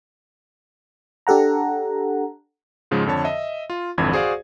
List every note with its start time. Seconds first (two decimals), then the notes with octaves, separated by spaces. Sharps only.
1.27 D4 G4 A4 F#5 A#5
2.91 G#2 C#3 F3 G#3
3.06 F2 D3 C#5 A5
3.24 D#5 E5
3.70 F4
3.98 G#1 F2 D3 E3 G#6
4.12 F#4 G#4 C5 D5 F5